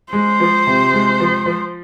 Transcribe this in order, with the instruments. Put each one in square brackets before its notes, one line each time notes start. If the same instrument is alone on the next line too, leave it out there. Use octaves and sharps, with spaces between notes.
[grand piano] G#3 [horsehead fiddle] C5
[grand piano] F3
C3
G#3
F3
F3